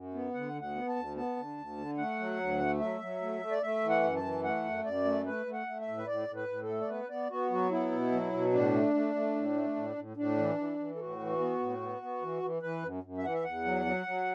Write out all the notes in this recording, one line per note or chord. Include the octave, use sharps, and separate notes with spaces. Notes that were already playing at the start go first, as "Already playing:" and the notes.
Already playing: F#2
B3
D3 F#5
D2
F#5
B3
A5
D2
B3 A5
D3
D2
D3
A3 F#5
F#3
D2
A3
F#3 E5
F#3
A3
A3
D5
A3 E5
E3
F#5
F#2
A5
E3
A3 F#5
F#2
F#2 D5
A3
A3 B4
A3
F#5
A3
E5
A2
B4
A2 D5
A2
B4
A2
A4
A3
D5
B3 B4
B3 D5
B3 F#4
F#3 F#4
B3 E4
B2
F#3
B2
A2 D4
A3
A3
A3
A2
A3
A2
A2
A2 D4
E3
E3
E3
A4
A2 F#4
E3
B3
A2
B3
B3
E3
E3
E3 B4
F#2
F#2
E5
E3 F#5
E5
E2 F#5
F#3
F#3
F#3